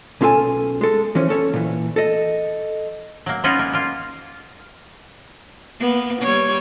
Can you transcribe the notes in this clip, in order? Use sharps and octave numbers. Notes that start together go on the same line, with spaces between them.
B1 C#4 F4 A4 G#5
G#3 A4
E3 F3 C#4
C#4 A4 C#5
A#2 E3
A4 D#5
F#3 A#3
B3 C#4 D#4 F4 F#4
A#3
A#3 F4
A#3 B3
G3 C#5